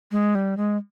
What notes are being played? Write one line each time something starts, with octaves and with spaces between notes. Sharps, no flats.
G#3
G3
G#3